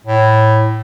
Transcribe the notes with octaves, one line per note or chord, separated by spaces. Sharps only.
A2